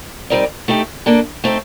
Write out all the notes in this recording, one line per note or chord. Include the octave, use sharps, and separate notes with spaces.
G3 C4 D#4 A#4 D5
A3 D#4 G4
A#3 D4 A4
A3 C4 D#4